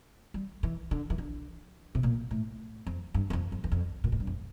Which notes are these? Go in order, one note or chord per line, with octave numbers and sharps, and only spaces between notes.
G3
E3
D3
E3
D3
C3
A#2
A2
F2
G2
E2
F2
F2
E2
F2
A#2
A2
G2
F2